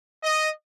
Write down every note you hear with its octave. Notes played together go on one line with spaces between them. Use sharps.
D#5